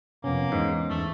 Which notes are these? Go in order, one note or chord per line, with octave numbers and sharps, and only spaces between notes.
F2 C3 A#3 B3 C#4
E2 G#2
E2 A3